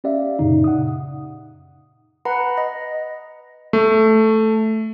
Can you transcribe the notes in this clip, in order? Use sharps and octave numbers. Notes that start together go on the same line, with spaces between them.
C#4 G4 D5 E5 F5
F#2 A#2 C#3 D#4
F#5 D#6
B4 F#5 A#5 B5
D#5
A3